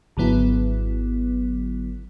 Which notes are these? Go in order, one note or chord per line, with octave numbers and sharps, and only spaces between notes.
G#1 D3 F#3 B3 E4